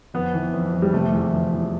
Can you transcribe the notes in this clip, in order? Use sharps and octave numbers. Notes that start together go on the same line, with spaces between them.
F2 B3
E3
F2
F2
G3
C3 A3
E2
F3
E2